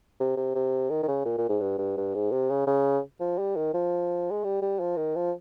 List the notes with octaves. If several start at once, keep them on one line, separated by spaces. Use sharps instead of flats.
C3
C3
C3
D#3
D#3
C#3
A#2
A#2
G#2
G2
G2
G2
G#2
C3
C#3
C#3
F3
G3
D#3
F3
G#3
G3
G3
F3
D#3
F3